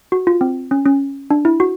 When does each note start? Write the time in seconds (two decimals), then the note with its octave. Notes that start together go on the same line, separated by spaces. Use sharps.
0.12 F#4
0.27 F4
0.41 C4
0.71 C#4
0.86 C#4
1.31 D4
1.45 E4
1.60 F#4